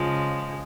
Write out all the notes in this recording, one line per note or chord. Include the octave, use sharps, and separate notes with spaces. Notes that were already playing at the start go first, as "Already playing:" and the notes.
Already playing: C#3 F3 G#3